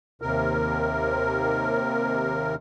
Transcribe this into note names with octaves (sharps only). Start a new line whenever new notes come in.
D#2 C3 A#4